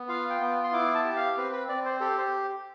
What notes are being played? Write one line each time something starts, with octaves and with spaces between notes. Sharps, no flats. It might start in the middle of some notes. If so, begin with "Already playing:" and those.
Already playing: B3
F4 F5
G5
B3
C6
E4 D6
A5
G4
F5
C4 B4
B4
C4 D5
C5
G4 A4
C5